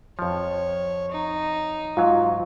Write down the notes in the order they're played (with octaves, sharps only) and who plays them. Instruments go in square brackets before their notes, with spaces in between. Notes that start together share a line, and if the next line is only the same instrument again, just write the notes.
[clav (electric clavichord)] F2 F3 [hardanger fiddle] C#5
[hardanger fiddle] D#4
[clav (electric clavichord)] G#2 F#3 [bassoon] F4